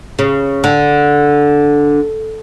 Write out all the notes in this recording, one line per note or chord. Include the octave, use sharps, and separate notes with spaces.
C#3
D3